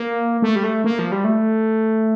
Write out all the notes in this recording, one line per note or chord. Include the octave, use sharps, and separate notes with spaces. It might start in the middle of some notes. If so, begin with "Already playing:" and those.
Already playing: A#3
A3
G3
A3
A#3
F3
G3
A3